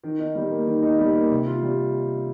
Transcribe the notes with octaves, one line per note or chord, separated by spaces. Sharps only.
D#3
D#4
G3
A#3
D#3
D#4
G3
A#3
C3
F4
G3